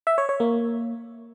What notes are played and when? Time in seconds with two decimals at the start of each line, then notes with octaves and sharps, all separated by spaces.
0.07 E5
0.18 C#5
0.29 C#5
0.40 A#3